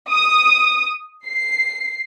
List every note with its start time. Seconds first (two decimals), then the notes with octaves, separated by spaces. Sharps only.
0.10 D#6
1.27 C7